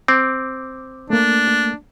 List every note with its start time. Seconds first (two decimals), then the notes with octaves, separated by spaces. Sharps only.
0.08 C4 D6
1.10 A3 A#3 D4